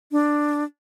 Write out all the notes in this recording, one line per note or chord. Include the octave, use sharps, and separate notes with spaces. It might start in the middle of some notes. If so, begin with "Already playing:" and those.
D4